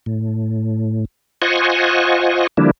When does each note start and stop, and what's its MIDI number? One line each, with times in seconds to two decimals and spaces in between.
0.06 1.05 45
1.42 2.47 65
1.42 2.47 72
1.42 2.47 75
1.42 2.47 78
1.42 2.47 80
1.42 2.47 85
2.57 2.71 50
2.57 2.71 53
2.57 2.71 55
2.57 2.71 58
2.57 2.71 62
2.57 2.71 64